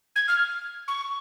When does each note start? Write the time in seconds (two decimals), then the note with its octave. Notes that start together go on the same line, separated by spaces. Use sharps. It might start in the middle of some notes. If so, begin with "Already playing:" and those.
0.16 G#6
0.28 F6
0.88 C#6